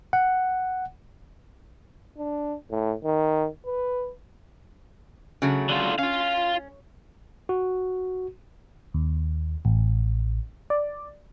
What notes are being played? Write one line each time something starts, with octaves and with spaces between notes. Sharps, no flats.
F#5
D4
A2
D#3
B4
C#3 F#3 A3
D3 F4
C#4 F4 F5
F#4
D#2
A1
D5